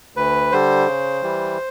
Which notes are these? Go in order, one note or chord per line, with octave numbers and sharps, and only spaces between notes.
D2 B4
D3 G3 C5
C#3
E3 G3